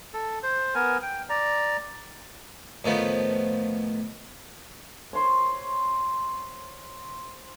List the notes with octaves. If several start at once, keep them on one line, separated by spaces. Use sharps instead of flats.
A4
C5
B3 A#4 G#5
G5
D5 A#5
A2 D#3 F3 B3
C5 C#5